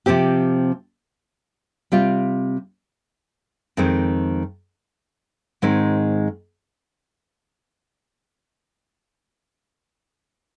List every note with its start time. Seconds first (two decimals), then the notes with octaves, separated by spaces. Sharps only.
0.06 C3 F3 C4 G4
1.92 C3 G3 C4 F4
3.77 F2 D#3 G#3 C4
5.62 G#2 D#3 G#3 C4 D#4